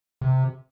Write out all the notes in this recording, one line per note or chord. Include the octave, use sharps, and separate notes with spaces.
C3